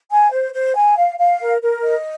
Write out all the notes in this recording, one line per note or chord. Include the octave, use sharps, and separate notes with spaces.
G#5
C5
C5
G#5
F5
F5
A#4
A#4
D#5